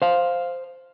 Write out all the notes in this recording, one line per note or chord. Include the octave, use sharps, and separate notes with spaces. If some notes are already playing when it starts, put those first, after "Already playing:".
C5 F5